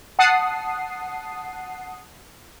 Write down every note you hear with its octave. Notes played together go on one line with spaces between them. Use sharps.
F#5 A5 D#6 C7